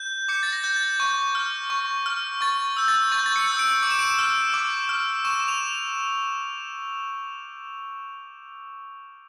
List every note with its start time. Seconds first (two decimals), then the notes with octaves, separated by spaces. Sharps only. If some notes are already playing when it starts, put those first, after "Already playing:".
Already playing: G6
0.28 D6 C#7
0.43 A6
0.53 A#6
0.64 G6
0.76 A6
1.00 C#6 G6
1.35 F6
1.70 C#6
2.06 F6
2.41 C#6 A6
2.77 E6 G6
2.88 A6
3.12 C#6 A6
3.19 G6
3.26 A6
3.36 C#7
3.47 E6 G6
3.59 D7
3.83 D6 D7
3.91 E7
3.99 D7
4.19 F6
4.54 D6
4.89 F6
5.25 C#6 E7
5.40 E7
5.48 F7